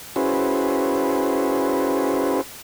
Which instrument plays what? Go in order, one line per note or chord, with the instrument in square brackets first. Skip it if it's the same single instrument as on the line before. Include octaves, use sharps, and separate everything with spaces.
[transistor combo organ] C#4 E4 F#4 G#4 B4 C5